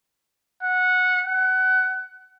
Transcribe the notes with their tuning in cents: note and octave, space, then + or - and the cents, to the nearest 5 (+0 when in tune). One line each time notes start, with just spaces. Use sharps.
F#5 -15
F#5 +20